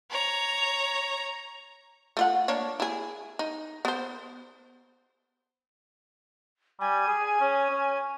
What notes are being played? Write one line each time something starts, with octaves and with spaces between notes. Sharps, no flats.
C#5 A#5
A3 F4 F#5
A#3 D4 C#5
E4 G#4
D#4
B3 C5
G3 G#5
G#4
C#4
C#4